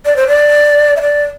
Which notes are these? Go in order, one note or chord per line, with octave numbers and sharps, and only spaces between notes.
D5
C5
D5
E5
D5